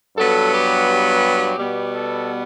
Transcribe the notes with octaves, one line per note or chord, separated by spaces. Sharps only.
G2 F#3 B3 A4
G4
G4
B2 G3 B3
A4